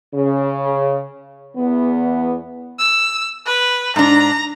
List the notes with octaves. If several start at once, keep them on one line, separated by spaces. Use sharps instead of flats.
C#3
E2 B3
E6
B4
G#2 D4 A#5